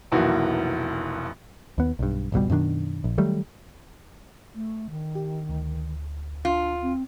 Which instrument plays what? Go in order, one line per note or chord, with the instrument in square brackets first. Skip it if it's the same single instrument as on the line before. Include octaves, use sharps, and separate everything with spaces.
[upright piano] F1 B1 E3 A#3 F#4
[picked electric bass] D#2 B3
B1 G2
G#1 C#2 B2 G3
F#2 B2 D#3 D4
A#1
D#3 F#3 G3 A3
[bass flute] A3
D#3
[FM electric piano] G4
D2
[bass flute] D4 [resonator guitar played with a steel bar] F4
[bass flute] C4